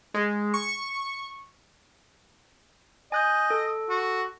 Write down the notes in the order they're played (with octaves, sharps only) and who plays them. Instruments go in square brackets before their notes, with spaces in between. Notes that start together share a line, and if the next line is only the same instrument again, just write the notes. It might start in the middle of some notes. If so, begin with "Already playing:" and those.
[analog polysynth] G#3
C#6
[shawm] D#5 [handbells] G#5 F#6 G6
[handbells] A4
[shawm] F#4